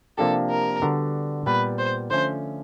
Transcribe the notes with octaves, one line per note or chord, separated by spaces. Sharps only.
C3 F3 A#3 D4 G4 A4
A#4
D3 G3 B3 D4 F#4
A#2 G3 B3 B4
C5
D3 F3 A3 C#4 C5